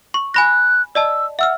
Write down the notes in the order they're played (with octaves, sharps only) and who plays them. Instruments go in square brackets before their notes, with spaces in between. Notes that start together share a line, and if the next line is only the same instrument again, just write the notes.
[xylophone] C#6
[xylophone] G#5 B5 A#6 [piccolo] F#6
[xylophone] D5 D#5 A5 [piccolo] E6
[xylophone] E5 E6 F6 [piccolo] F#5